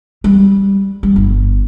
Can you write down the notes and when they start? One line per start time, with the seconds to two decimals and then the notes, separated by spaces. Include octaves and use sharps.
0.24 G3
1.03 G3
1.16 G1